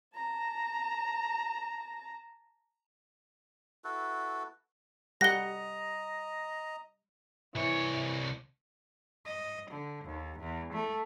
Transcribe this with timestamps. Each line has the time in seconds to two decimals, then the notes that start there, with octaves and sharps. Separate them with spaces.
0.15 A5 A#5
3.84 E4 F#4 A4 B4
5.21 G3 D#5 F#5 A#5 A#6 G7
7.55 C2 E3 C#5
9.26 D#5
9.71 D3
10.05 D#2
10.40 E2
10.74 A3